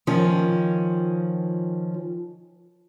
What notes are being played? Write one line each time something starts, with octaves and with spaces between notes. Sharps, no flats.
D#3 F3 C#4